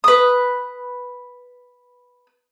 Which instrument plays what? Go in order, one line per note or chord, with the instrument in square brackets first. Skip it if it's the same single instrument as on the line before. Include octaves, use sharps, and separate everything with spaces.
[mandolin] B4 D#6